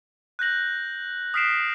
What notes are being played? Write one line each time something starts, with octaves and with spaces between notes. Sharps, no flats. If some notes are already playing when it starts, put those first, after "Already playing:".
F#6 G6 A#6 F#7
D#6 F6 B6 C7 D7 E7